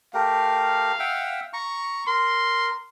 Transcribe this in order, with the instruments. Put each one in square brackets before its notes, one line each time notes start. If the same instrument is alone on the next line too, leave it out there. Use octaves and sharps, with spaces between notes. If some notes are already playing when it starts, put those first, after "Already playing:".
[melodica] A3 G4 A#4 [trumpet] F5
[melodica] E5 F#5 G5
A#5 C#6
[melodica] A#4 [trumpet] C6